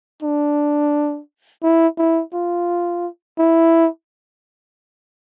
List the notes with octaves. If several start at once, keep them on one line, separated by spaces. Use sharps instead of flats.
D4
E4
E4
F4
E4